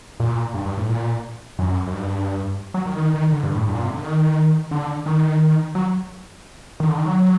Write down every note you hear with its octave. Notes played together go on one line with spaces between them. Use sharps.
A#2
G2
G2
A2
A#2
F#2
F#2
G2
F#3
D#3
D#3
D#3
D3
G2
A2
G2
A#2
C3
D3
D#3
D3
D#3
F#3
D#3
D3
D#3
F#3